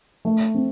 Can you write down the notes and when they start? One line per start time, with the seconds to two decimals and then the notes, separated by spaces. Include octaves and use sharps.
0.25 A3
0.55 C4